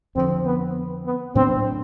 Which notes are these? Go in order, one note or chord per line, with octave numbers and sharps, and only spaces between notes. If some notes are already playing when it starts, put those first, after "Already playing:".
F2 D3 F3 C4
B3
B3
A2 F#3 B3 C4 D4